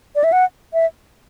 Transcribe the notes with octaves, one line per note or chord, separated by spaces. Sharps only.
D5
E5
F#5
E5